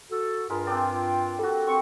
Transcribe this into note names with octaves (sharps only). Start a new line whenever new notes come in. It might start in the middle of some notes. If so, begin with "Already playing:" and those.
F#4 A4
G2 G#3 F4 A#4 B5
C4 D4 D5 G5
G3 F#4 A4
C4 C#6